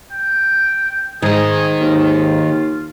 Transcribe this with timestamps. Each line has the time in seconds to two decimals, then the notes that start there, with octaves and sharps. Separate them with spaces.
0.11 G5
1.22 G#2 D#3 G#3 G#4 D#5
1.81 D#2 F4